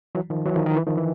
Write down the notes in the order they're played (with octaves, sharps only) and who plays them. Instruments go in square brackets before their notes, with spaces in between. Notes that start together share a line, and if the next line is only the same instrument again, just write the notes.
[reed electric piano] E3 F#3
D#3 F3
E3 F#3
D#3 F3
D#3
E3
D#3 F3
E3